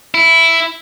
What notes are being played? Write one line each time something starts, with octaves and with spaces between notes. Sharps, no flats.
E4